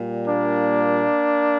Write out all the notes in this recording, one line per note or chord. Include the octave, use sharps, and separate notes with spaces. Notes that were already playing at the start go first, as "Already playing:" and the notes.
Already playing: A#2 G3
A#3 D4